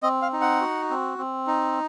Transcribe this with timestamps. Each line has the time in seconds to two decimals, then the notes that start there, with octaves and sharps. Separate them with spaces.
0.03 C4 D#5
0.22 F5
0.33 D#4
0.41 F#5
0.61 F#4
0.90 C4
1.18 C4
1.47 D#4